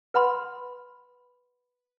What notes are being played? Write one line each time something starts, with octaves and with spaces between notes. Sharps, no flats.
B4 F#5 B5 C6